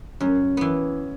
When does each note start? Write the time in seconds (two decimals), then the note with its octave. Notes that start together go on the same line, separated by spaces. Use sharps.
0.20 F#2 C#4
0.57 E3 B3